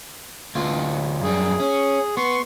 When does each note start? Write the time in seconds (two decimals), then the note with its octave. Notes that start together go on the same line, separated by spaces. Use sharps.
0.55 D2 F4
1.23 F#2 G3 G#4
1.60 C#4
2.17 B3 C6 C#6